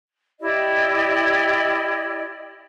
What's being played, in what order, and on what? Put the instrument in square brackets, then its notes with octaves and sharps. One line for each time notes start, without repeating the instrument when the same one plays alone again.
[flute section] E4 G4 D5 D#5